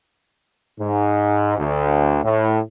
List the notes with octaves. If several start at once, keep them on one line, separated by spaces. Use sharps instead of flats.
G#2
D2
A2